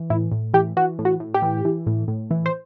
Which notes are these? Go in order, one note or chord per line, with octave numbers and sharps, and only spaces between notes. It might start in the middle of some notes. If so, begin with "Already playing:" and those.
Already playing: E3
A2 E4
A2
E3 G4
E3 F#4
A2
F#4
A2
G4
E3
E3
A2
A2
E3
C5